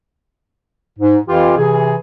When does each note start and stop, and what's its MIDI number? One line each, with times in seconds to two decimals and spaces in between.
0.99 1.18 44
1.28 1.54 41
1.28 1.54 52
1.28 1.54 65
1.28 1.54 67
1.58 1.96 48
1.58 1.96 52
1.58 1.96 68